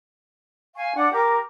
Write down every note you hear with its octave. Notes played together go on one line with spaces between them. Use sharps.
F5 G#5 C#6
D4 F#5 D6
G4 A#4 D6